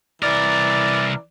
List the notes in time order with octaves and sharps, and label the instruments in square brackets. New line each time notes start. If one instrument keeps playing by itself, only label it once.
[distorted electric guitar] C2 A#4 [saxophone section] E3 D5 [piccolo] A6